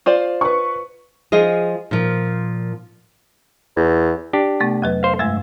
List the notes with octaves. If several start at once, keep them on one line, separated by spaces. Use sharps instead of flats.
F4 C5 D5
B4 C#6
F3 F4 G#4 D#5
A#2 F3
E2
D4 G4
C3 A3 B3
F2 F#3 B4
C5 F5
G2 G#3 A3 E5